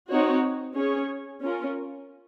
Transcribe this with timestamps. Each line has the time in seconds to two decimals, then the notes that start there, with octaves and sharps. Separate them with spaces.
0.09 C4 D#4 F#4 C#5
0.75 C#4 G#4 C#5
1.42 C#4 F4 A#4